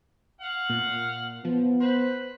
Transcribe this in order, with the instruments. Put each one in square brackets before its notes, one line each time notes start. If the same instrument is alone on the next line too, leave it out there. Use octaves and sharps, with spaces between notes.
[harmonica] F5 F#5
[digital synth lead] A#2
[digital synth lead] F3 [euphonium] B3
[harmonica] B4 [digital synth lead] C5